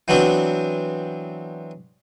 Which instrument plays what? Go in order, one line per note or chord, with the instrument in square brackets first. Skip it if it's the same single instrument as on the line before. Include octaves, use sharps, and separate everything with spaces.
[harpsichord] E3 F#3 B3 C4 D4